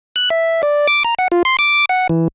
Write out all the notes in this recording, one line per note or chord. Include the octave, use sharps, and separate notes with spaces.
F#6
E5
D5
D6
A#5
F#5
F4
C6
D6
F#5
E3